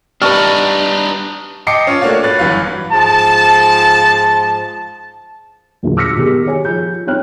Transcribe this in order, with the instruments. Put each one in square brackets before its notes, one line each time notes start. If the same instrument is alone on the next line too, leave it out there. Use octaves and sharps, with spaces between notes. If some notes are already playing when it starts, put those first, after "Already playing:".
[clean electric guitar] G3 B4 [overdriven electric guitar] D4 D#4 [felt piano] A5 C#6 F6
[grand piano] D#5 G5 A5 D6 C7 C#7
C#4 F4
A3 A#3 D4 F#4 C#5 F5
B4 C#5 F#6 A6
G1 E3 F#3 B4 F5
[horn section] G#2 F3 A5
[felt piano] E2 A#2 D3 F#3
D6 E6 F6 A#6 B6 C#7
B2 D#3 G4 G#4
G4 G#4 C#5 G#5
F3 G6
C4 D#4 C#5 G5 F6 F#6